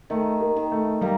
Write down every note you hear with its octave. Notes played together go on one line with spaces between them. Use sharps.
D#3 A3
A#3
D#3
A3
G3 A#3